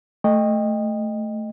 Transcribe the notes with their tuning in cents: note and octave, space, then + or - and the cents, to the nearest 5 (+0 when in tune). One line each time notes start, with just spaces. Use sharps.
A3 +0 D#5 -10 G5 +25